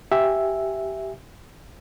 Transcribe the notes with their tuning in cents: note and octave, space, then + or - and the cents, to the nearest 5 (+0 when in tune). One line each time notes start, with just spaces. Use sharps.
G4 -15 E5 +0 G#5 -15